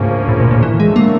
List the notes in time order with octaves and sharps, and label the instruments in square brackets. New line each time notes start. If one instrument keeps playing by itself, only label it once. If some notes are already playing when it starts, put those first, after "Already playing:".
Already playing: [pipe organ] D2 C#3 F3 A#3 C#4 [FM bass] G#2
[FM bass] A2
A#2
A#2
[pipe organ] D3 F#3 A3 [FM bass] E3
[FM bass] G#3
A#3